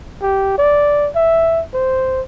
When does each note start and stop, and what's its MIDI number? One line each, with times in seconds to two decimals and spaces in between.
0.22 0.55 67
0.58 1.10 74
1.16 1.62 76
1.74 2.21 72